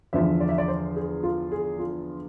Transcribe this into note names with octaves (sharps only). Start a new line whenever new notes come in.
E2 D3 F3 E5
D5
E5
D5
C5
G#4
F4
G#4
F4